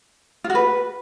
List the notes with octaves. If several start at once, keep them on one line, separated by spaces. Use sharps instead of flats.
F4
F#4
B4